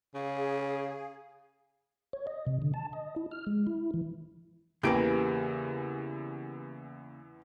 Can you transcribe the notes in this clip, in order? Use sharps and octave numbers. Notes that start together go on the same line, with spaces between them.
C#3 G#4 F5
C#5
D#5
C3
D3
A5
D#5
E4
F6
G#3
E4
E3
E2 C#3 E3 A#3 G4 B4 D7